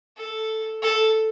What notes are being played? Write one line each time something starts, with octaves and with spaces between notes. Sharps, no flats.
A4
A4